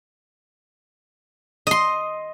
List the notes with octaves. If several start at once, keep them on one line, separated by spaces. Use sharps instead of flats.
D#5 C6